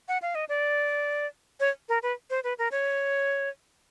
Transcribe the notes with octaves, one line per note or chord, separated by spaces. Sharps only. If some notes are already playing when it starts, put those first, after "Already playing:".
F#5
F5
D#5
D5
C#5
A#4
B4
C5
B4
A#4
C#5